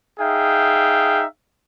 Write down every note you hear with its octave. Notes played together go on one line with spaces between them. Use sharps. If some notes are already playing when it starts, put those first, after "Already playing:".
D#4 G#4 E5 F5 G5